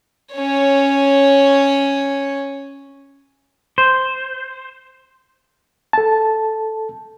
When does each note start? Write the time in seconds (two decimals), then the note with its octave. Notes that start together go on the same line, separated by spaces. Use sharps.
0.33 C#4 C#5
3.78 C5
5.93 A4 A5